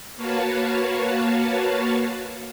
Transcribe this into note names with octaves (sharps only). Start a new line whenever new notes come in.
A#3 F#4 B4 C#5 F5 A5